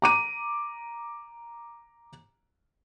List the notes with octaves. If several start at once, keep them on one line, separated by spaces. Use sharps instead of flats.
A#5 D6 D#7